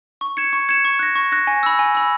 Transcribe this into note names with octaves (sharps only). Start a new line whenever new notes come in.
C#6
G#6 C#7 E7
C#6
G#6 C#7 E7
C#6
F#6 A#6
C#6
F#6 A#6
G#5
B5 E6
G#5
B5 E6